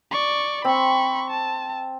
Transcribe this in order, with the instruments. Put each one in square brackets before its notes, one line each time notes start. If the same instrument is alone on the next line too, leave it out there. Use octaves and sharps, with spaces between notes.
[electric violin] D5 C#6
[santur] C4 [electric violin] B5 C#6
[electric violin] A5